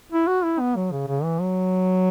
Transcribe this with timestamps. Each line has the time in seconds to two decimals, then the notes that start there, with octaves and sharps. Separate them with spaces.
0.12 E4
0.27 F#4
0.44 E4
0.60 B3
0.76 F#3
0.92 C#3
1.07 C#3
1.24 E3
1.40 F#3